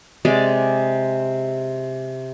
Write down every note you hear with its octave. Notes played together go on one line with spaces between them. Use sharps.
C3 G#3 D5